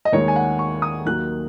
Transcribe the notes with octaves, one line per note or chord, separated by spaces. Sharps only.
D#5
D#2 D#3 G#3 C#5
G#5
F#5
C#6
D#6
D#2 D#3 F#3 A#3 F#6